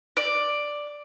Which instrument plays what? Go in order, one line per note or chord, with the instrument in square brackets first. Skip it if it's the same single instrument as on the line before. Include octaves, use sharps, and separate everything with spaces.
[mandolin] D5